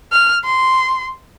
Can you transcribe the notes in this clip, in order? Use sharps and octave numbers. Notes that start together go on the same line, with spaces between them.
F6
C6